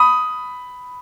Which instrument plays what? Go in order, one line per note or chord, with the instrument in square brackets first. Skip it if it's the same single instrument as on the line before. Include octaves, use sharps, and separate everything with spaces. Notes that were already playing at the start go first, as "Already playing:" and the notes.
Already playing: [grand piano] B5 D#6